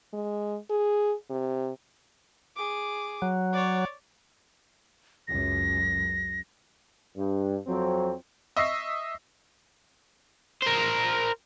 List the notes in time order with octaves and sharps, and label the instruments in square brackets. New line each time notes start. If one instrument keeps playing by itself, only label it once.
[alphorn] G#3
G#4
C3
[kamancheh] G#4 D6
[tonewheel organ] F#3
[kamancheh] C#5 D5
[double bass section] C#2 F#2 [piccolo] A#6
[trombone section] G2
F2 F#3 C4
[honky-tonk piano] D#5 E5 C#6 E6 A#6 C7
[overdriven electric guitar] A#4 C5